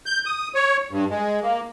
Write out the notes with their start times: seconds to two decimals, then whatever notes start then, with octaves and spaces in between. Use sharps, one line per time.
0.06 G6
0.26 D#6
0.55 C#5
0.91 G2
1.11 G#3
1.43 A#3